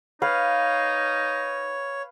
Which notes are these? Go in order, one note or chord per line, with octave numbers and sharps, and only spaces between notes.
D#4 B4 C#5 F5